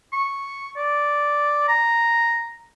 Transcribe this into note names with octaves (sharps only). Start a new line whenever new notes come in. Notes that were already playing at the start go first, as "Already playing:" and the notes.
C#6
D5
A#5